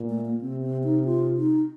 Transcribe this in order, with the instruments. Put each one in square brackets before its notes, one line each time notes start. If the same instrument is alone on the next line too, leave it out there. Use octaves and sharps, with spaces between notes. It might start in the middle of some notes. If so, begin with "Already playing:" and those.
Already playing: [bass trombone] A#2
[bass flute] A3
A#3
[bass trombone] C3 [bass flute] C4
[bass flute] C4
D#4
F4
D#4